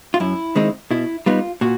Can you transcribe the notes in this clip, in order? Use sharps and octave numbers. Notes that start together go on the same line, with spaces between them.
F4
F#2 E4
D#3 G#3 C4 D#4
B2 E4
G3 B3 D#4 F4
A#2 F#4